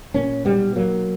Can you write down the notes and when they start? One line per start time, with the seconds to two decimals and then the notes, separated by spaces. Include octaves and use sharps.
0.14 A#2 A#3 C#4
0.45 B1 G3 B3
0.76 B1 F#3 A#3